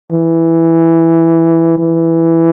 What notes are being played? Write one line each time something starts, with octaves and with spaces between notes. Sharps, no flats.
E3
E3